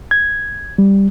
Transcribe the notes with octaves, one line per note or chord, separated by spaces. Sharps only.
G#6
G3